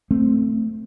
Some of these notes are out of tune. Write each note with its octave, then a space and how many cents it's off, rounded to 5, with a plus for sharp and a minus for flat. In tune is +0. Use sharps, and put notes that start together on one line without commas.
A3 +10 C4 +0